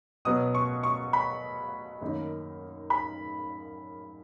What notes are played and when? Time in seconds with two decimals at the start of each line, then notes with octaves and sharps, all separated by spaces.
0.25 B2 F#3 B3 D#6
0.55 C#6
0.83 C#6
1.13 B5
2.01 F#2 D#3 A#3 D#4
2.90 B5